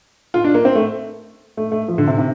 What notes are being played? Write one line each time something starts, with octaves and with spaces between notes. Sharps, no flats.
F4
D4
A#3
C4
A3
A3
A3
F3
D3
C3
C3